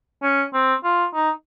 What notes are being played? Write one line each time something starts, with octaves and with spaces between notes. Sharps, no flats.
C#4
C4
F4
D#4